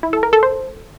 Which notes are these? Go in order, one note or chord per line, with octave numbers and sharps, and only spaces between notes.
E4
A4
A#4
A4
C5